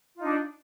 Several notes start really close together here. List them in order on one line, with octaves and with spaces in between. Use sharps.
F4 D#4 D4